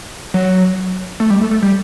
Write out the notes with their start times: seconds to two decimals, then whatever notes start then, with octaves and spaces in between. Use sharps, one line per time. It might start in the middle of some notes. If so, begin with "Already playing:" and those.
0.34 F#3
1.20 A3
1.30 G3
1.41 A3
1.51 A3
1.62 G3